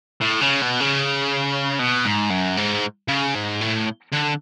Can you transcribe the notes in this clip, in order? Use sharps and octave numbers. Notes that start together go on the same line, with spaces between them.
A2
C#3
B2
C#3
B2
G#2
F#2
G#2
C#3
G#2
A2
D3